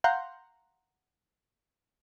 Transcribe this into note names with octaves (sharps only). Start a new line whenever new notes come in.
F5 F#5 A#5 C6 G6